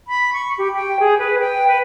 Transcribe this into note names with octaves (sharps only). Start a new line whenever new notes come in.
B5
C#6
G4
G5
G#4
B4
G5
B4